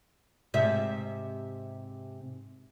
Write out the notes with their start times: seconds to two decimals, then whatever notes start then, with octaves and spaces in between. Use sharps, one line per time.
0.54 G#2 C3 E5